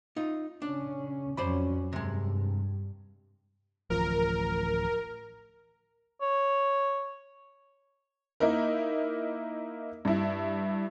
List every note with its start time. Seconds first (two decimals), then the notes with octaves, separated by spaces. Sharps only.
0.16 D#4 F4
0.62 C#3 C#4 D4
1.37 F2 F#3 C#4 C5 D5 B5
1.93 G2 C3 G#3
3.90 D1 A1 F3 A#4
6.22 C#5
8.40 A#3 D#4 E4 A#4
10.05 G2 E4